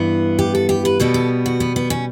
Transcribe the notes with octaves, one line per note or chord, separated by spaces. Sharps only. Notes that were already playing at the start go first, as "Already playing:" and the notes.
Already playing: G2 E3 B3
G4
A4
G4
B4
B2 G3 B3 A4
A4
F#4
B3
B3
C#4